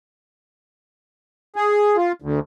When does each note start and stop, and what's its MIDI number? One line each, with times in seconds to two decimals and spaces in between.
1.56 1.96 68
1.96 2.12 65
2.22 2.40 38